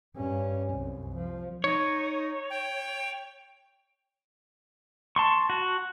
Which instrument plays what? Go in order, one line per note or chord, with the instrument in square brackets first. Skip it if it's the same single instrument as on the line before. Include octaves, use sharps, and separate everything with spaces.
[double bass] G2 C#4
C2 F#2
F3
[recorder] D#4 [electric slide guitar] C#5
[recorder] G5
[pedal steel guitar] A5 C6 C#6
F#4